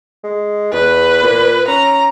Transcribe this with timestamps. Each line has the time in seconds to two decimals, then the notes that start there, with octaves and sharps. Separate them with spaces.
0.24 G#3
0.73 E2 B4
1.24 A#2
1.68 C#4 A#5